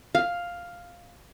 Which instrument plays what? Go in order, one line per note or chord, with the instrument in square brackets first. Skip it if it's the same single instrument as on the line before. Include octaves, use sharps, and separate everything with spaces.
[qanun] F5